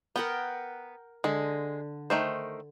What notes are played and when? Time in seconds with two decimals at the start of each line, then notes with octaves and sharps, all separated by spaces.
0.16 B3 A#4 F#5 G5
1.24 D3 G#3
2.10 D#3 A3 C5